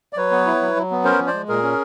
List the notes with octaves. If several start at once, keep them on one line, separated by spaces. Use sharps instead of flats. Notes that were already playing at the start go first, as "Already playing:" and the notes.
D5
F#3 B4 C#5
B3
E4
F#3
F#3
B3
C#4 A#4 C5
F3
C5 D5
G#3
A#2 G#4 A#4
C#4